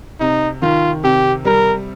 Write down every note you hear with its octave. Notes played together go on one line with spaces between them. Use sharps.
C3 D#4
D#3 F4
C3 G4
G3 A#4